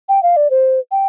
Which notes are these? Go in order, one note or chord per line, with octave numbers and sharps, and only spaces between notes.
G5
F5
D5
C5
G5